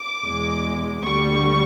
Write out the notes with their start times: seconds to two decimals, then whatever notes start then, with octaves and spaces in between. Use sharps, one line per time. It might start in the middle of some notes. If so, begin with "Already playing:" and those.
Already playing: D6
0.25 E2 B2 G#3
1.05 D2 D3 G3 C#6